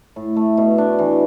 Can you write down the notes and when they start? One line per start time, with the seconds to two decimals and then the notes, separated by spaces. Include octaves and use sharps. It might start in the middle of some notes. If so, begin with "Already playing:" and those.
0.16 A2
0.36 A3
0.57 B2
0.78 D4
0.99 E3